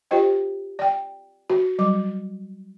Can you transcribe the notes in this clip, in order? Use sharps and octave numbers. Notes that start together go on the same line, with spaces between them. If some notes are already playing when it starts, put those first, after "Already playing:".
F4 G4 C5 D#5 G5
D5 G5
F#4
F#3 G3 D6